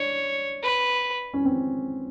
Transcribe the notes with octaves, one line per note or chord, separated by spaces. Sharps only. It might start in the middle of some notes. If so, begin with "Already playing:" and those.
Already playing: D4 C#5
B4
C#4
C4